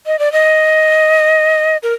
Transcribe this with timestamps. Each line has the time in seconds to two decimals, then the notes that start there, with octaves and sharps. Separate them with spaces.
0.06 D#5
0.19 D5
0.32 D#5
1.83 A#4